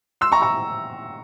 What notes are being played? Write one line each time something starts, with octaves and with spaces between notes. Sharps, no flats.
C6 E6
A#5 C#6
A#5 C#6